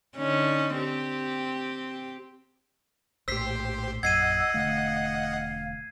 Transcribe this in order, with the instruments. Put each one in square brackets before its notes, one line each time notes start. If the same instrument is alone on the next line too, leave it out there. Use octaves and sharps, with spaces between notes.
[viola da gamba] D3 C#4 D#4
C4 G4
[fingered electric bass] A#1 A2 [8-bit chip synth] G4 C5 [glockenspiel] E6 B6 C7
[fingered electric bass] A#1 F#2 [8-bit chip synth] D#5 F#5 [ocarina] E6 [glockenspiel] G#6 C7 D#7
[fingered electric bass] E1 D3 A3 [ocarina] F5